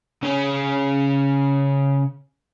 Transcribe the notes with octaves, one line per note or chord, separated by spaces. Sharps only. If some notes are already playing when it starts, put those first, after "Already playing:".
C#3 C#4